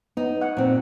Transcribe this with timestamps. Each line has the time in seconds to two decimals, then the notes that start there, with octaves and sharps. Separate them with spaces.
0.17 B3 D#4
0.41 F#5
0.57 A#2 C4